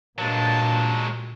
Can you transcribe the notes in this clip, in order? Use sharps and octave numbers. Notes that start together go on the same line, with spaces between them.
G2 A#2 F#3 G#3 A#3 A5